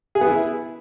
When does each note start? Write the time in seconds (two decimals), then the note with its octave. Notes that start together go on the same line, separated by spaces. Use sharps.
0.15 G#4
0.21 B3
0.27 E4